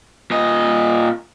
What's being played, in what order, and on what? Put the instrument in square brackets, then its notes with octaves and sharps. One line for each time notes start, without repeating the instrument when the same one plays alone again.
[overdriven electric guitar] A#2 D#5